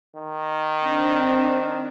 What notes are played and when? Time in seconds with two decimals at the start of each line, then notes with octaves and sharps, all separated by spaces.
0.16 D#3
0.84 C4 D4